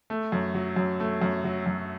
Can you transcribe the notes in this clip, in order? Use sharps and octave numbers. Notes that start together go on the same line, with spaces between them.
A3
F#2
F#3
F#2
A3
F#2
F#3
F#2